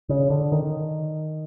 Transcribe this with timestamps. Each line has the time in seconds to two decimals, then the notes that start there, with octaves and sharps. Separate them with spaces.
0.09 C#3
0.30 D3
0.52 D#3